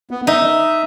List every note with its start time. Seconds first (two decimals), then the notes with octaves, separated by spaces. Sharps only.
0.11 B3
0.27 D#4 E5